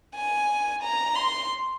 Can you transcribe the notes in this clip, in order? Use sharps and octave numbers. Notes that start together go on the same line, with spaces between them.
G#5
A#5
C6